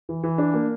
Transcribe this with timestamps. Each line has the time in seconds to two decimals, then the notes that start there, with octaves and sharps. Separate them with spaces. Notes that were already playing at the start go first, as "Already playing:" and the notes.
0.09 E3
0.23 E3
0.38 D4
0.54 A#3